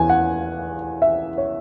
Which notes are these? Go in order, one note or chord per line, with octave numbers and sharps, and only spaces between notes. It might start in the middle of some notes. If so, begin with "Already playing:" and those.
Already playing: E2 E3 G#5
F#5
E5
C#5